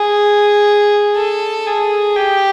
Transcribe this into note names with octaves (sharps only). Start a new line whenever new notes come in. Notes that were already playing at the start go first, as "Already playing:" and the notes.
Already playing: G#4
A4
G#4
G4